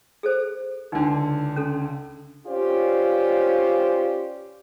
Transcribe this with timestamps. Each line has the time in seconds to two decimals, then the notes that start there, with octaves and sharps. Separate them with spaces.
0.23 G#4 A4 C5
0.92 C#2 D3 D4 D#4
1.56 C#4 A4
2.47 C#4 F4 G4 C5 D5